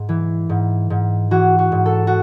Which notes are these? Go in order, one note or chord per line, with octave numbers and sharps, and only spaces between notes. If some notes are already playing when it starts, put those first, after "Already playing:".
Already playing: G#2
E3
G#2
G#2
E3 F#4
F#4
G#2
A4
F#4